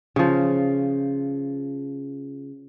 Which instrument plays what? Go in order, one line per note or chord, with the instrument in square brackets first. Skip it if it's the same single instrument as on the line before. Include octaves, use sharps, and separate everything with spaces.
[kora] C#3 F3